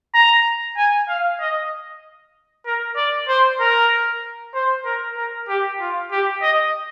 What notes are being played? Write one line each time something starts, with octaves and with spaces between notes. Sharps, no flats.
A#5
G#5
F5
D#5
A#4
D5
C5
A#4
C5
A#4
A#4
G4
F4
G4
D#5